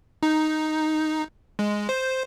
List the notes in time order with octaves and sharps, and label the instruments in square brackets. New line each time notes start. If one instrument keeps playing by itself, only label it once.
[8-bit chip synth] D#4
G#3
C5